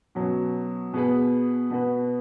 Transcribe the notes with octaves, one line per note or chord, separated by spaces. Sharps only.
B2 F#3 C#4
B2 B3 G#4 B4
B2 B3 F#4 B4